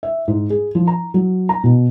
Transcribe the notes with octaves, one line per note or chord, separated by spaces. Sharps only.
E5
G#2
G#4
F3
A#5
F#3
A#5
B2